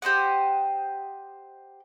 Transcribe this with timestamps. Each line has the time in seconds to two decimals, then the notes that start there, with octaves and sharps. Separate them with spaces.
0.02 G4 C5 D#5 F#5